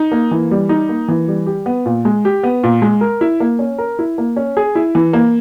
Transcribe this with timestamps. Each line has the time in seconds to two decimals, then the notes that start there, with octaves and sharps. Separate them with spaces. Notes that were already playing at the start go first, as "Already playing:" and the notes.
Already playing: D#4
0.12 A#3
0.31 E3
0.51 G3
0.69 D#4
0.89 A#3
1.08 E3
1.28 G3
1.47 G4
1.66 B3
1.86 A#2
2.05 G#3
2.25 G4
2.43 B3
2.64 A#2
2.82 G#3
3.01 A#4
3.21 E4
3.40 A#3
3.59 C#4
3.78 A#4
3.99 E4
4.18 A#3
4.36 C#4
4.57 G#4
4.75 E4
4.95 E3
5.13 A#3